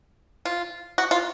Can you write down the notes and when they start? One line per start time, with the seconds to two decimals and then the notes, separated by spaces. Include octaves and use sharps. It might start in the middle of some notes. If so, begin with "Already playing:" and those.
0.45 F4
0.98 F#4
1.11 F4